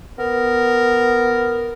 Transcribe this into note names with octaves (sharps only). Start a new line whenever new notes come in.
B3 A#4